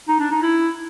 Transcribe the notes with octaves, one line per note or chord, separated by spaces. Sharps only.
D#4
D4
D#4
E4